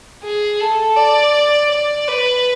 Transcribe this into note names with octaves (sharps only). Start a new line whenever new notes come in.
G#4
A4
D5
D5
B4